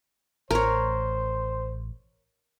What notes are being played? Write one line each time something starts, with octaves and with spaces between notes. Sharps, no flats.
A1 A#4 C5 C#5